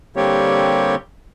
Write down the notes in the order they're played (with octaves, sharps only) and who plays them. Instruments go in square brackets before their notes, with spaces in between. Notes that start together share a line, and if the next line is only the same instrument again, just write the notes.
[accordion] D3 G3 A#3 C4 G4 C#5